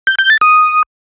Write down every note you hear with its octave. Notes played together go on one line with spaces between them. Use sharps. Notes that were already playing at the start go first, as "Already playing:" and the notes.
G6
G6
A6
D#6